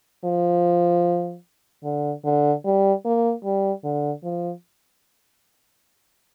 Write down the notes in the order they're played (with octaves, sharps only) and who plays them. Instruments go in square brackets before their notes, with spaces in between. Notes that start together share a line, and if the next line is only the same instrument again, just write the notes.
[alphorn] F3
D3
D3
G3
A#3
G3
D3
F3